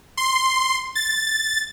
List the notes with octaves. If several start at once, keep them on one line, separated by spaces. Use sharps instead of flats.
C6
A6